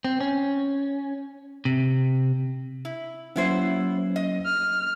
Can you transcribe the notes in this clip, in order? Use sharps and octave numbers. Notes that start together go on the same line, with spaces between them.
C4
C#4
C3
E4
F#3 A#3 B3 C#4 E4 C5
D#5
F6